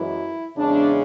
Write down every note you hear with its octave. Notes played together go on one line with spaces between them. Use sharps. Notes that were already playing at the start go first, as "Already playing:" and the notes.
Already playing: F#2 E3 G#3 E4
E2 C#3 G#3 D4